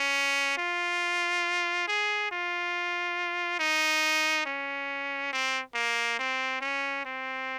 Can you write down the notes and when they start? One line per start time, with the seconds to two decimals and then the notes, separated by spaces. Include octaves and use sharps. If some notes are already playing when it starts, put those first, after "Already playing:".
Already playing: C#4
0.58 F4
1.88 G#4
2.31 F4
3.59 D#4
4.46 C#4
5.33 C4
5.75 A#3
6.19 C4
6.61 C#4
7.05 C4